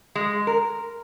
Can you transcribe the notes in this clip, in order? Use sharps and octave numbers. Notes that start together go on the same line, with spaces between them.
G#3
A#4